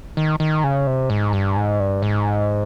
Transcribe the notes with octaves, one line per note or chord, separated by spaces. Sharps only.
D#3
D#3
C#3
C3
G#2
G2
G#2
G2
G#2